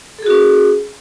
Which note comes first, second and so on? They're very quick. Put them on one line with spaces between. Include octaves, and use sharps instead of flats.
A4 G#4 F#4 C#4